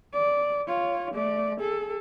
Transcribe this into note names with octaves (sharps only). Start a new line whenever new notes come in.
D5
F4 C#5
A3 D5
G#4 A4